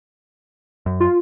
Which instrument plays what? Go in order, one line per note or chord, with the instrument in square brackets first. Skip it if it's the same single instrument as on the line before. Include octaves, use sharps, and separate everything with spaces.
[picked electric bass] F#2
[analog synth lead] F4